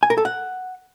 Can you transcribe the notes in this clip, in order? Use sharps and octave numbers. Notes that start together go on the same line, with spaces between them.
G#5
A#4
A4
F#5